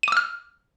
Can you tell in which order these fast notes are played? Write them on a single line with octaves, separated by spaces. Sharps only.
D#7 D6 E6 F6